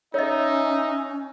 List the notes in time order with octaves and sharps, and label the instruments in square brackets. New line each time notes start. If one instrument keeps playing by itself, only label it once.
[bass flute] C#4 [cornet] D#4 [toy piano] C#5 D#5 [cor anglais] E5